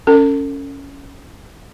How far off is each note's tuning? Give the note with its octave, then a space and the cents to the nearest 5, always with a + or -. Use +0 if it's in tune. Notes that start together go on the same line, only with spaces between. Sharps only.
C#4 +5 A4 +40